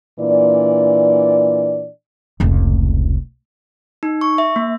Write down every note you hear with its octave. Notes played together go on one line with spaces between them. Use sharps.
A#2 E3 D4 D5
F1 C#2
D#4
C#6
E5
A#3